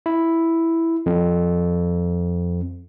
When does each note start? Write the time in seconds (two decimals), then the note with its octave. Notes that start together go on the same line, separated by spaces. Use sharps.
0.06 E4
1.06 F2